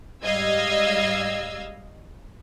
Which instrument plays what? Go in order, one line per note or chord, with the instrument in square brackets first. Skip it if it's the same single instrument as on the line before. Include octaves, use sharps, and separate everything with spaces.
[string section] G#2 G3 D#5 F5 E6 G#6